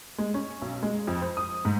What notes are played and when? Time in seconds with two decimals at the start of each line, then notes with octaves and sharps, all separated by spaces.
0.18 G#3
0.34 C#4
0.62 B1
0.83 G#3
1.07 F2
1.22 C5
1.37 D#6
1.65 G#2